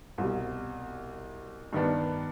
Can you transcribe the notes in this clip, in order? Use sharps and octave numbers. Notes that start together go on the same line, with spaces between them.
C2 B2 G3
G2 D#3 B3 D4